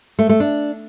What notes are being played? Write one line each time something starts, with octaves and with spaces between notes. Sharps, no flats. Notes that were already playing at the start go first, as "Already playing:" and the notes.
A3
A3
D4